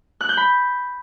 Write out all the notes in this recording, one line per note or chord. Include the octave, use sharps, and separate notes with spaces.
F#6
G6
B5